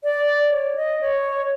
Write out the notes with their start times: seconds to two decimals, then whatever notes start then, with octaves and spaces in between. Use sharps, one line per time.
0.04 D5
0.49 C#5
0.75 D#5
1.01 C#5